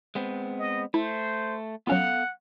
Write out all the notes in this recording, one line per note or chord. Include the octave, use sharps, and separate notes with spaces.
G#3 B3 C4
D#5
A3 E4 C5
F#3 B3 C#4 F4 A4 F5 F#5